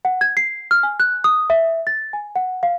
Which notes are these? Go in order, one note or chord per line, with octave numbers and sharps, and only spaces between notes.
F#5
G#6
C7
F6
G#5
F#6
D#6
E5
A6
G#5
F#5
F5